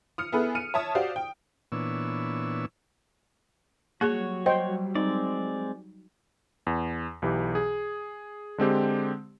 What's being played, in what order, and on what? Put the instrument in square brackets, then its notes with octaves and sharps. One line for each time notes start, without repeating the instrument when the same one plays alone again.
[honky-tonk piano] D#6 F6 C#7
B3 E4 G#4 A4 B4
F6 C#7 D#7
C#5 E5 A5 D#6
F#4 G4 C5 D5 F5
G5
[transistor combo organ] A#2 E3 B3 D4 C#5 E6
[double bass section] F#3 G3 [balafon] A#3 G#4 [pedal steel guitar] F#4 C#5
[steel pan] C5 G5 [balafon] D#5
[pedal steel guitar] G#3 C4 D5 [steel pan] D#4
[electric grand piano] E2
B1 E3 G4
G#4
D3 G#3 C4 G4